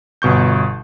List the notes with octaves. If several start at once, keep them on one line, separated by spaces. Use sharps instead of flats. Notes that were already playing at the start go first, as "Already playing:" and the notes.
G1 B2 C#6 G6